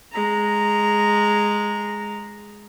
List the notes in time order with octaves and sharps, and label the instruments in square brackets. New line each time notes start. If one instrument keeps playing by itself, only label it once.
[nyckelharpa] G#3 A#5